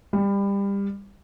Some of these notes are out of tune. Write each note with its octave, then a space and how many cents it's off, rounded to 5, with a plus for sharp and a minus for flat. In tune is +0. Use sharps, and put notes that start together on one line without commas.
G3 +25